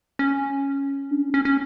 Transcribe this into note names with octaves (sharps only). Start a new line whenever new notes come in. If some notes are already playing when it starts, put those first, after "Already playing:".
C#4
D4
C#4
C#4
C#4